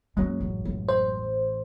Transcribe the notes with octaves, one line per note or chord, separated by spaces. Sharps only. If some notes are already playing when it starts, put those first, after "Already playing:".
F#2 F#3 G#3 A#3 C#4
A1
A1
C5